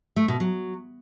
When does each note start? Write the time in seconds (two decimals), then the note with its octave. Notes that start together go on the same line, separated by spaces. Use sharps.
0.16 A3
0.28 B2
0.40 F#3